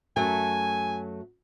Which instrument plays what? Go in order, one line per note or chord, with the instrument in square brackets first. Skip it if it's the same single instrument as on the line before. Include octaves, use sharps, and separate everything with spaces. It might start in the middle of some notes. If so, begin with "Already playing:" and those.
[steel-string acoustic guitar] F#2 F#3 A3 [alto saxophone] G#5